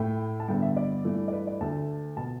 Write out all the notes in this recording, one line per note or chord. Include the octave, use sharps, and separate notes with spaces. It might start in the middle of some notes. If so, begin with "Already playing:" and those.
Already playing: A2 A3 G5
A5
G2 D3 B3 G5
E5
D5
G2 E3 A3
D5
B4
D5
D2 D3 A3 A5
B2 B3 A5